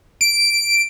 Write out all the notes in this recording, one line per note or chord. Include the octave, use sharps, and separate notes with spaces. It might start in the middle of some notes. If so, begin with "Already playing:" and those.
D7